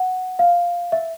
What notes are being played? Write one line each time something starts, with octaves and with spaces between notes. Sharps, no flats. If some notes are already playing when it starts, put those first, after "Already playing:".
Already playing: F#5
F5
E5